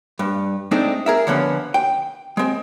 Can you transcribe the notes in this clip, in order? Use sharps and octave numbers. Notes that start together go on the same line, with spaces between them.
G2
G#3 A3 C4 D4 D#4
G#4 A#4 E5
D3 F3 B3 C#4
G5
G#3 C4